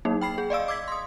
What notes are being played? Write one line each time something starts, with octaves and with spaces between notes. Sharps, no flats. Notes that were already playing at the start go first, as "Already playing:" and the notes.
F#3 A#3 D#4
G5 B5 C7
G#4
D5 D#5 F5 E6
D6 E6 G#6 B6
C6 D#6